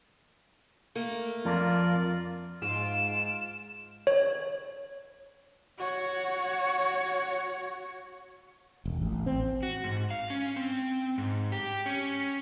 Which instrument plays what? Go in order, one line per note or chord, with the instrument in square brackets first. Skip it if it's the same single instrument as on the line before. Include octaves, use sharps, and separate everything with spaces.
[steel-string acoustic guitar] A3 A#3
[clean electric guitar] F2 [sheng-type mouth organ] F4 A#4 D5
[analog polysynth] G#2 F4 D7 [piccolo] E7
[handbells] C#5
[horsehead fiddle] F#4 C#5
[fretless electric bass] E1
A1
C4
[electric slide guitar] F#4
G#2
F5
C#4
C4
G#2
G4
C#4